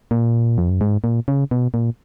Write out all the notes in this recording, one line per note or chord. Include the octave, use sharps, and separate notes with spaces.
A#2
F2
F#2
G#2
A#2
C#3
B2
A#2